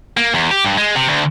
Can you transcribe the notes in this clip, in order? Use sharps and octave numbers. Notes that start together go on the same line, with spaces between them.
A#3
E2
G4
G2
G#3
C3
D2